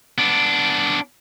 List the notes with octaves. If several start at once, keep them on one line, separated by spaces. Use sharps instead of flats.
B3 D4